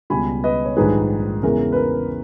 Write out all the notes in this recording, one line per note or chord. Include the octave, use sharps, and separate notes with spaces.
C#2 B2 G3 G#5 B5
B4 D#5
C#5
A#1 G#2 D#3 G3 G#4 B4
E2 C#3 E3 G#3 A#4
B4
A#4